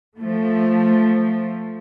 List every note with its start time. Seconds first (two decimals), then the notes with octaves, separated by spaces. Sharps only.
0.17 F3 A3